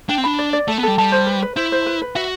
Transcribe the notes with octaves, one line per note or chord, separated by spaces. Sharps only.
D4 G5
C4
D4 B5
D5
D5
A3 A4
B3
G3 A4
G3 A5
C5
B4
B4
E4 C5
C5
B4
B4
F#4 E5